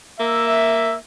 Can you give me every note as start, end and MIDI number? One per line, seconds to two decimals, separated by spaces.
0.20 0.95 58
0.20 0.94 76